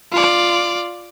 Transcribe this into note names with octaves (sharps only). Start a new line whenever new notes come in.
F4 D5